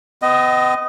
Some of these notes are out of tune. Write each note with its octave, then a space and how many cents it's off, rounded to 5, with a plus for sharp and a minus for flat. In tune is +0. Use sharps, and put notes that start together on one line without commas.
B3 +45 D#5 +0